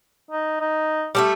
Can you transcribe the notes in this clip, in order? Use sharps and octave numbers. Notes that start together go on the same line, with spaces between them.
D#4
D#4
G3 A3 E5